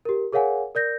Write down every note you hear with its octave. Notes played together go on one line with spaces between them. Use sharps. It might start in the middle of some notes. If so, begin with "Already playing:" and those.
G4 A#4
G#4 A#4 C#5 F5 F#5 G#5
A#4 D5 G6 A#6